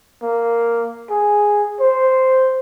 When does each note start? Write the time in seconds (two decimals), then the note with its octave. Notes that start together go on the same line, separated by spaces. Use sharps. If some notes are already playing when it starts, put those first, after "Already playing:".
0.22 A#3
1.10 G#4
1.81 C5